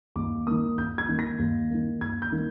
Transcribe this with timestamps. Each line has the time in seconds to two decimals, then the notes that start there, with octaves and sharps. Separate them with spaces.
0.15 D#2 D6
0.47 D#3 A#3 D#6
0.77 D#2 G6
0.98 G#6
1.08 D#3 A#3
1.19 A#6
1.39 D#2
1.70 D#3 A#3
2.01 D#2 G#6
2.22 G6
2.32 D#3 A#3